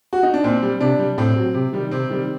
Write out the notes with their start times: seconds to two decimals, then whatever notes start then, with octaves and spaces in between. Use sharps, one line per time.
0.13 F#4
0.23 D#4
0.34 D4
0.44 A#2 C4
0.62 G3
0.80 C3 D4
0.99 G3
1.18 A2 C4
1.36 F#3
1.54 C3
1.73 D#3 G3
1.91 C3 C4
2.11 D#3 G3